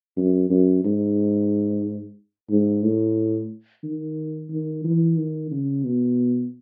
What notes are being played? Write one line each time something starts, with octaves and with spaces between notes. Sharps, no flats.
F#2
F#2
G#2
G#2
A2
D#3
D#3
E3
D#3
C#3
B2